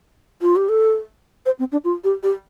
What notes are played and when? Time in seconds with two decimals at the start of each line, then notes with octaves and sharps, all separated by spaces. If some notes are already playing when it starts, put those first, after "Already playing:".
0.42 F4
0.56 G4
0.69 A4
1.46 C5
1.59 C4
1.72 D4
1.84 F4
2.04 G4
2.23 G4